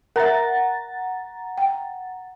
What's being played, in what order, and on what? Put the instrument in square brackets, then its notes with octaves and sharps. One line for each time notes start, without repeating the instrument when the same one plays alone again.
[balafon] A#4 E5 [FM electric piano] F#5 A#5 A6
[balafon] G5